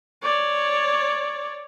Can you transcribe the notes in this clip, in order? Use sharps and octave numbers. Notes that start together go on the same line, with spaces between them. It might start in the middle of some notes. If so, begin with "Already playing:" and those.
C#5 D5